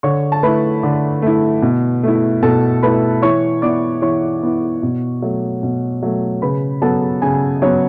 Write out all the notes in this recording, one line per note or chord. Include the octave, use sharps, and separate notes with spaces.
D3 C#5 C#6
A5
A3 E4 B4 B5
D3
A3 E4
B2
A3 E4
B2 A4 A5
A3 E4 B4 B5
E3 C#5 C#6
B3 E4 D5 D6
E3 C#5 C#6
B3 E4
B2
F#3 A3
B2
F#3 A3
C#3 B4 B5
F#3 B3 A4 A5
C#3 G#4 G#5
F#3 B3 C#4 C#5